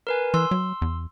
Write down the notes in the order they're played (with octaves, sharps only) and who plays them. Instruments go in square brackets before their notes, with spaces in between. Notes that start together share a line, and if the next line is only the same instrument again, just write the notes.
[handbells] A#4 B4 G#5
[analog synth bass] E3 [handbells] C6 E6
[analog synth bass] F#3
E2